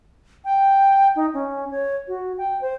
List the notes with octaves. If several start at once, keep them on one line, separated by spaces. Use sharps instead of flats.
G5
D#4
C#4
C#5
F#4
G5
C5